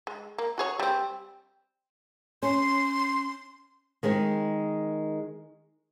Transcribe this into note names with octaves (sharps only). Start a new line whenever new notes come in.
G#3
A#3
F#4 G#4 C#5
G3 C4
C#4 C6
D#3 G#3 C4 D#4